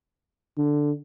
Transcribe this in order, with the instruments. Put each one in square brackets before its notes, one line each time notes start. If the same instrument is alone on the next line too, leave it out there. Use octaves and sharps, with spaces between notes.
[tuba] D3